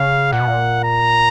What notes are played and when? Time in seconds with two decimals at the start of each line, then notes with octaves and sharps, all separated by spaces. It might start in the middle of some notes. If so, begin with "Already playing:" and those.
Already playing: C#3 F5
0.32 A#2 F#5
0.40 B2
0.47 A#2
0.84 A#5